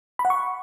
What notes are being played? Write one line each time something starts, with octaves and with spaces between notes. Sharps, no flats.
B5
F#5
C#6